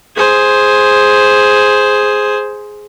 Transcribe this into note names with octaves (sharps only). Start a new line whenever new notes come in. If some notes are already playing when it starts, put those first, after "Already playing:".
G#4 C5